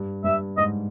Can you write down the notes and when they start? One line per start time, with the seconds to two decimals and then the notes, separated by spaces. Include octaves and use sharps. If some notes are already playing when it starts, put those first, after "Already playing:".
Already playing: G2
0.24 G2 E5
0.57 G#2 D#5